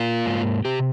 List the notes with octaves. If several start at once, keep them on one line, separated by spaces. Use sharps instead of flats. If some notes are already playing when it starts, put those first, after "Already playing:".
Already playing: A#3 F4
G#2
C3 G4